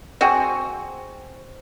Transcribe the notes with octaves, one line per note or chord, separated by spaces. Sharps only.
C4 F#4 G#4